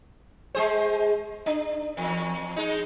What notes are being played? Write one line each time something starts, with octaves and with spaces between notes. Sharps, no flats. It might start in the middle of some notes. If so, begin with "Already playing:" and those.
G#3 G#4 C5
D4
E2
G#3 D#4